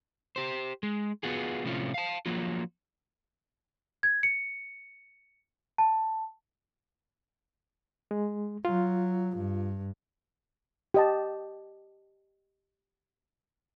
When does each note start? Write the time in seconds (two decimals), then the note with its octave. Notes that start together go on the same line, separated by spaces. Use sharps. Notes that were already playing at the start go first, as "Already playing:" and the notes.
0.36 G4 C5
0.83 G#3
1.23 B3 F4 F#4 G#4
1.65 A2 C3 F3 C#4 F4
1.94 F5 A5
2.26 F3 F#3 A#3 F4
4.03 G#6
4.23 C#7
5.78 A5
8.11 G#3
8.65 F#3 F4
9.37 G2
10.94 G4 D#5 A5